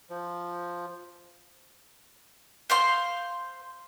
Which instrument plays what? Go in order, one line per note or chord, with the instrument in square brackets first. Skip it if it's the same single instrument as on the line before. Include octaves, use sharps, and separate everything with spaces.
[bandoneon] F3
[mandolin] C5 F5 C6